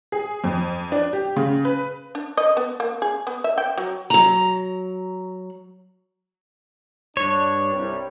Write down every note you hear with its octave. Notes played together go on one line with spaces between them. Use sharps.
G#4
F2
D4
G4
C#3
B4
D4
D#5
B3
A#3
G#4
B3
E5
G5
F#3
F#3 A#5
G2 D4 C#5
C2 G3